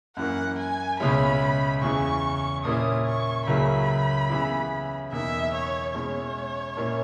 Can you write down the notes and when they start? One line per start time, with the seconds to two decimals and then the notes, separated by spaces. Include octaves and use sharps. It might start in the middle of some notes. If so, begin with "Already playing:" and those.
0.17 F#2 E3 A#3 F#5
0.59 G#5
1.00 C#2 B2 G#3 C#4 E4 B5
1.82 E2 C#3 E3 C#6
2.65 A#2 A#3 C#4 E4 D#6
3.06 C#6
3.47 C#2 C#3 F#3 A#3 E4 B5
4.30 C#3 E3 B3 E4
5.12 E2 B2 A#3 D#4 E5
5.54 C#5
5.94 B2 G#3 C#4 E4 C#5
6.77 A#2 A#3 C#4 E4